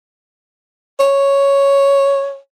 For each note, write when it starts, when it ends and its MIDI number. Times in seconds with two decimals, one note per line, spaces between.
1.00 2.38 73